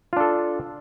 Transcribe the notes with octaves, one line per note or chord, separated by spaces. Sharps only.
D4 F4 A4